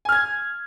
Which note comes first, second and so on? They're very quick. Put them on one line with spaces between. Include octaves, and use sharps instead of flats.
G#5 F6 G#6